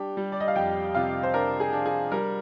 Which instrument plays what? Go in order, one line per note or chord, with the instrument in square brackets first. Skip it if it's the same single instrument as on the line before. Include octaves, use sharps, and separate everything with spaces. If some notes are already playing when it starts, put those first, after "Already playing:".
Already playing: [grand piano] G3 D4 G4
G3
D5
D#5
F5
F2 G4 G5
C3 F4 F5
C5
D4 A#4
G#4
D4
G#4
G3 A#4